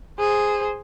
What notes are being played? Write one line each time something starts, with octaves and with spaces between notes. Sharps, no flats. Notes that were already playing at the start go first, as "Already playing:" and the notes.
G#4 C5